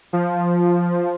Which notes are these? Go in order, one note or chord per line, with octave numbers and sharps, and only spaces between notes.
F3